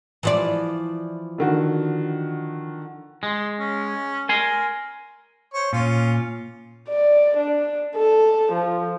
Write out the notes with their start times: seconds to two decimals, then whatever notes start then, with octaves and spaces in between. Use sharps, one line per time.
0.23 E3 F3 D5
1.38 D3 D#3 F#4
3.23 G#3 C6
3.59 C#4
4.29 A#4 G#5 C6
5.54 C5 C#5
5.73 A#2 C#4 F4
6.89 D5
7.37 D4
7.95 A4
8.53 F3